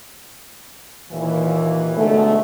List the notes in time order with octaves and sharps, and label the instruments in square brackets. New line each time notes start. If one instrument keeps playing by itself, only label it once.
[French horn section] D#2 A#2 E3
G#2 B2 D3 A3